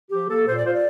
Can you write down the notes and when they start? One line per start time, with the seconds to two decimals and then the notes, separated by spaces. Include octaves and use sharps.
0.11 F3 G4
0.29 A#3 A4
0.47 A#2 C5
0.56 D5
0.65 F4 C5
0.74 D5